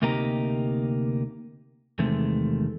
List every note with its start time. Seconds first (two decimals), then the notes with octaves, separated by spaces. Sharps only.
0.02 D2 C3 A#3 D#4 G4 A#5
1.99 E2 C3 D#3 G#3 A3